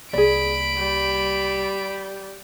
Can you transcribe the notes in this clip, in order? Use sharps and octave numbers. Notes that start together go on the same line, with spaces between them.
C2 A#3 G#4 D5 B5 D7
G3